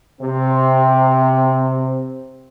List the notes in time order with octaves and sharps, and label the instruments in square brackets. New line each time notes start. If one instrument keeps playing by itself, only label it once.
[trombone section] C3 C4